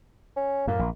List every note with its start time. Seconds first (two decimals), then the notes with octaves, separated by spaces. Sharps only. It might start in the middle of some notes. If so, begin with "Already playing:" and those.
0.36 C#4
0.67 F#2 A2 A#3
0.79 A#1